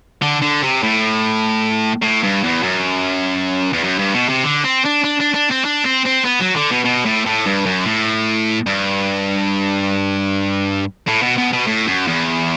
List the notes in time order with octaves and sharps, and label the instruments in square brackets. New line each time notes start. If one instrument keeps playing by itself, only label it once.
[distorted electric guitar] D3
D3
C3
A2
A2
G2
E2
F#2
E2
F#2
G2
B2
C3
D3
C4
D4
D4
D4
D4
C4
D4
C4
C4
B3
F#3
D3
B2
B2
A2
A2
G2
F#2
A2
G2
A2
B2
B2
B2
A2
F#2
E2